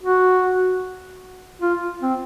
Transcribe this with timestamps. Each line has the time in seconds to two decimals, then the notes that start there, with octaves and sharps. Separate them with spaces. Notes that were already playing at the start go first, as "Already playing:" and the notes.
0.03 F#4
1.62 F4
2.02 C4